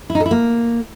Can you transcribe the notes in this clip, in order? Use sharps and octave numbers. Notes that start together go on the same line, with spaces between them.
E4
D#4
A4
E4
A#3